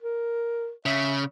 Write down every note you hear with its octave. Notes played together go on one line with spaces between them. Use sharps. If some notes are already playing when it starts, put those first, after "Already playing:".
A#4
C#3 E5